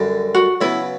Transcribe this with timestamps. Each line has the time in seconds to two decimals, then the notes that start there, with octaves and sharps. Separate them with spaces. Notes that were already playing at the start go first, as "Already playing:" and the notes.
Already playing: F#2 D3 G3
0.35 F#4
0.61 C#3 F#3 B3 E4